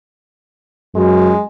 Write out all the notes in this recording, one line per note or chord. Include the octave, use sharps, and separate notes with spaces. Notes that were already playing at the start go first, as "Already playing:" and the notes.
F#2 G#3